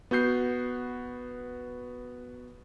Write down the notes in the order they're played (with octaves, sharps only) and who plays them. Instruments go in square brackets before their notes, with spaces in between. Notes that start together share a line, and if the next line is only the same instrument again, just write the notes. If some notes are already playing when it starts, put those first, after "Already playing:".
[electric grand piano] B3 F#4 G6 C7